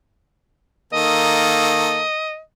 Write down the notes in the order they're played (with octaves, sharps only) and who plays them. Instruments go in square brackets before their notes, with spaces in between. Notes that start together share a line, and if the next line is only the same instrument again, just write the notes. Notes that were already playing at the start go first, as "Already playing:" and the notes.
[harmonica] D#3 A4 [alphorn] A#3 [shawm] D#5